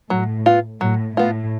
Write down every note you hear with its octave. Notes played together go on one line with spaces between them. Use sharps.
A2 F#3
B3 F4
A2 F#3
A2 B3 F4